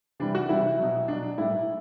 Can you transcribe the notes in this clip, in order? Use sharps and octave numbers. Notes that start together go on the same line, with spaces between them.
C3 E3 G3 D4
F#4
C3 E3 G3 E4
B2 F#3
B2 F#3 D4
A2 G3 E4